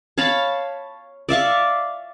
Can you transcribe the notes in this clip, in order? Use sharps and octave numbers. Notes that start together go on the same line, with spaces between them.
C#5 F5 A5 B5
D5 E5 F5 C#6